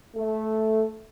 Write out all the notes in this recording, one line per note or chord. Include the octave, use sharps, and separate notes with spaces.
A3